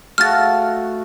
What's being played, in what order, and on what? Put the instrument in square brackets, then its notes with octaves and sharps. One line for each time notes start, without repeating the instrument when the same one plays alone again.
[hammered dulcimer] A3 F#4 F5 [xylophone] F6 A6